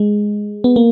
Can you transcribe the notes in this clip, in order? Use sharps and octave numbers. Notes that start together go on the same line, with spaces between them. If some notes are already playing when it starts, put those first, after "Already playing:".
Already playing: G#3
B3
A#3